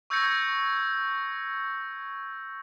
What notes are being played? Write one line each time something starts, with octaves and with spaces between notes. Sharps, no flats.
C#6 E6 G6 G#6 A#6 C#7